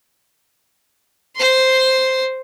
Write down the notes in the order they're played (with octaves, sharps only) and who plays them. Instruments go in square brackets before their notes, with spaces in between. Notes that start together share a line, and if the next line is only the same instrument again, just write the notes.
[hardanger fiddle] C5 C6